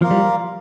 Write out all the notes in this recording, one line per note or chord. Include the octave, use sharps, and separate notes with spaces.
F3 A#3 F4 A#4 F5
G3